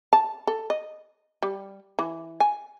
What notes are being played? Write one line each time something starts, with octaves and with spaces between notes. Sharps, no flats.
A5
A4
D#5
G3
E3
G#5